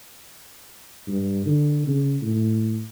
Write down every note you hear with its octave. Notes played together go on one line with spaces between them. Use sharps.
G2
D3
C#3
A2